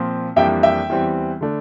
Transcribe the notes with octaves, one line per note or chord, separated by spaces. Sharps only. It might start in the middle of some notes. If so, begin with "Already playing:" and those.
Already playing: A#2 F3 C4
F2 E3 G3 A#3 D4 E5 G5
E5 G5
E2 E3 G3 C4
D3 A3 D4